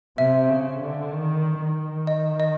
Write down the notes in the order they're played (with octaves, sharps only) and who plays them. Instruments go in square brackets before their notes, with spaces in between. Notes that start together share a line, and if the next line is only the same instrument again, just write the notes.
[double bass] C3 [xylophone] E5
[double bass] C#3
D3
D#3
D#3
[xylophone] D#5
D#5